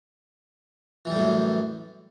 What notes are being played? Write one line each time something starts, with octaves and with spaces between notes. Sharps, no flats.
F#2 A2 E3 G3